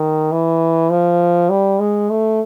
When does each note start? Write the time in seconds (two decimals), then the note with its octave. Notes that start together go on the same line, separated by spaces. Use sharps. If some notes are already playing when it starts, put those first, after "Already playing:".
Already playing: D#3
0.32 E3
0.91 F3
1.50 G3
1.80 G#3
2.10 A3